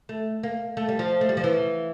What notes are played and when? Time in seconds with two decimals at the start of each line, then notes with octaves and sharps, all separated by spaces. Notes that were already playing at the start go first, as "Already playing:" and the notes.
0.09 A3
0.43 A#3
0.77 A3
0.89 G3
0.99 F3
1.21 A3
1.29 G3
1.37 F3
1.44 E3